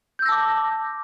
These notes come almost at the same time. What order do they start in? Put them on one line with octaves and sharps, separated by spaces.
G6 E6 A#6 A5 D6